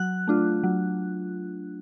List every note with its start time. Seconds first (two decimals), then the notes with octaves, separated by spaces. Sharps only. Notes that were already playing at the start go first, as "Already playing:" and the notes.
Already playing: F#3 F#6
0.27 A3 D4 F4
0.63 F#3